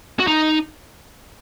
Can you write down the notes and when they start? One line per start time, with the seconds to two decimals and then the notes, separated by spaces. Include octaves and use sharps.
0.19 F#4
0.27 D#4